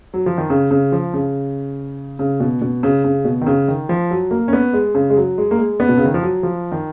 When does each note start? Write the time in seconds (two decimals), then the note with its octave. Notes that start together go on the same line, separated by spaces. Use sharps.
0.14 F#3
0.26 F3
0.38 D#3
0.50 C#3
0.71 C#3
0.92 F3
1.14 C#3
2.19 C#3
2.40 B2
2.62 B2
2.83 C#3
3.04 C#3
3.25 B2
3.42 D#3
3.47 C#3
3.68 D#3
3.89 F3
4.11 F#3
4.31 A#3
4.48 C#4
4.53 B3
4.73 G#3
4.95 C#3
5.10 G#3
5.17 F#3
5.38 G#3
5.51 A#3
5.58 G#3
5.80 B3
5.89 B2
5.98 C#3
6.05 D#3
6.14 F3
6.23 F#3
6.43 F3
6.72 D#3